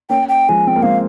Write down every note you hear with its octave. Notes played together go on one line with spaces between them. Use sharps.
A#3 C#4 G5
G5
F3 G#3 G#5
C4 G5
A#3
G#3 C4 F5